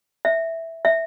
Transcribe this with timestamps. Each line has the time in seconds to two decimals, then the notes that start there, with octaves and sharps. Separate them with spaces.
0.25 E5
0.85 E5